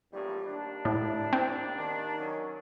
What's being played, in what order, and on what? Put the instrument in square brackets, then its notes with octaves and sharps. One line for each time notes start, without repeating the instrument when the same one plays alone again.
[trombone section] A#1 E2 A2 [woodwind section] G3
[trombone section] D#2 D4
[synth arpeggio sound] A2 [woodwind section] E4
[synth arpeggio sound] C4
[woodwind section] D#3
[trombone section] F#3 C#4